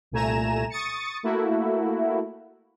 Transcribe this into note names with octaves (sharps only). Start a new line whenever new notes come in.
C2 A#2 A3 G#5 A#5 E7
C#6 D#6 A6 C#7
A3 A#3 E4 F#4